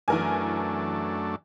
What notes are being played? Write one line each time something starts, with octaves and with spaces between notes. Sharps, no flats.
F#2 E3 A3 D4 A#4 G#5